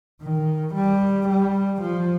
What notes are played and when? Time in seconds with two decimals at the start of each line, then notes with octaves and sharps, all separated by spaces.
0.22 D#3
0.74 G3
1.28 G3
1.82 F3